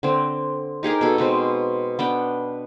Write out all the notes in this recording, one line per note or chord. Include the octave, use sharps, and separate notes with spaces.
D3 C4
D#4 G4 G#4 A#4
B2 A4
B2 G#3 C4
B3 D4 G5